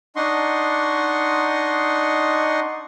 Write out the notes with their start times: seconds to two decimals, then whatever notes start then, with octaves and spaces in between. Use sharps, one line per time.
0.16 D4 D#4 D#5 F#5 C6 C#6